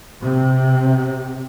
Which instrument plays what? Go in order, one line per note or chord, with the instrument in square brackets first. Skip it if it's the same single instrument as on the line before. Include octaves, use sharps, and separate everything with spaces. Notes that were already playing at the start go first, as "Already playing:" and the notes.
[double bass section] C3